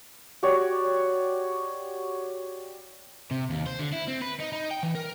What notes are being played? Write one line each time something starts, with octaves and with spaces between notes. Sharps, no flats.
F#4 G4 C#5 D5
C3
D#2
C5
D3
E4
C4
B4
D#4
D#4
G5
E3
A#4